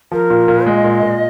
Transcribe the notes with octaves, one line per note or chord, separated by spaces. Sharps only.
F3 A#4
A#2
A#2
G#3 D#5
A#2
A#2